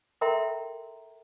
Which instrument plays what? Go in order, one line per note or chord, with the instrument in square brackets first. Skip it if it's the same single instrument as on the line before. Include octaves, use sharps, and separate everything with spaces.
[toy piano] A4 A#4 E5 G5 A#5 C6